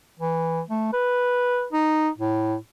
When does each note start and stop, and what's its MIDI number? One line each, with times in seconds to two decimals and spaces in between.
0.19 0.61 52
0.70 0.92 57
0.93 1.66 71
1.72 2.09 63
2.18 2.56 45